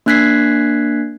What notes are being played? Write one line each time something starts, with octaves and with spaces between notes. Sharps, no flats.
A#3 D4 F#6 G#6 B6 C7